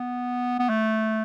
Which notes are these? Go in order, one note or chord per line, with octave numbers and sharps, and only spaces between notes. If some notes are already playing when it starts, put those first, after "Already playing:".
Already playing: B3
B3
A3